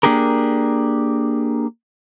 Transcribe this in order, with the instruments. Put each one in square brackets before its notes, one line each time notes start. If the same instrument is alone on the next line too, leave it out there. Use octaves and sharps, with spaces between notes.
[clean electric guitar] A#3 D4 G4 G#4 A#4